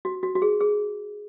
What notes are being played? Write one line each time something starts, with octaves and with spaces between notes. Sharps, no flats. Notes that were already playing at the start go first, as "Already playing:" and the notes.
F#4
F#4
F#4
G#4
G#4